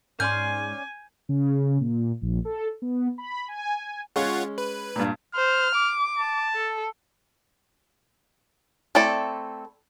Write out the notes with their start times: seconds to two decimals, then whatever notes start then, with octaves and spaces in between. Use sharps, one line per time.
0.20 G#2 C#4 D5 G#5 C6 G6
1.29 C#3
1.81 A#2
2.22 A#1
2.45 A4
2.82 B3
3.18 B5
3.48 G#5
4.16 G#3 C#4 F4 C#5 F#5
4.58 B4
4.96 G2 A#2
5.35 C5 F6
5.75 D6
6.19 A5
6.55 A4
8.95 A3 C4 E4 A4 D5